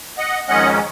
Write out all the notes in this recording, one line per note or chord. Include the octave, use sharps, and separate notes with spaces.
D#5 F#5
F2 D#3 G#3 C#4 D#5 F#5